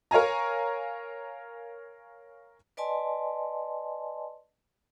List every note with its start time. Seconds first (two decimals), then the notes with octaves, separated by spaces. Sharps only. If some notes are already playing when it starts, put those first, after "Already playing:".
0.11 A#4 C#5 F5 G#5 A#5
2.77 B4 D5 D#5 G#5 A5 C6